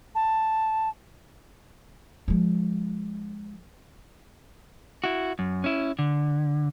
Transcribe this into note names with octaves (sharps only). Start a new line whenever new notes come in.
A5
F3 G#3
E4 F#4
F#2
C#4 E4
D3